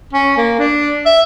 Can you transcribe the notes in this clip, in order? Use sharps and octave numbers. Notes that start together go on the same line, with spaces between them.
C#4
A#3
D4
E5